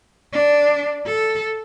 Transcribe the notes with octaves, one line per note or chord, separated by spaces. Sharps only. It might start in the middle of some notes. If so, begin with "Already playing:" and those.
D4
A4